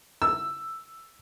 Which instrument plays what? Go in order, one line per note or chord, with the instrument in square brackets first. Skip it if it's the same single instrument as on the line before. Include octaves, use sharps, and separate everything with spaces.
[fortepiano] E6